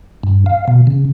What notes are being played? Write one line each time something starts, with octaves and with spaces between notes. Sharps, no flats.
G2
F5
B2
C#3